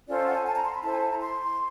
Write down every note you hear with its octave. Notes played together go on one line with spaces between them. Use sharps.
C#4 F4 A4 C5 D5
D#5
F#5
G#5
A5
A#5
C6
B5
E4 A4 C5 A5
G#5
A5
A#5
C6